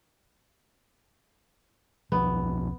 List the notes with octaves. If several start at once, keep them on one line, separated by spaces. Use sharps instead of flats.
E1 B1 F3 B3